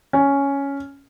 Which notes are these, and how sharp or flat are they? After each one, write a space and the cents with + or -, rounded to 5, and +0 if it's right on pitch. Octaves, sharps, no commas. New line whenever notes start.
C#4 +5